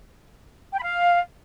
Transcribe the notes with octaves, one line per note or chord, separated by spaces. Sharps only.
G5
B5
F5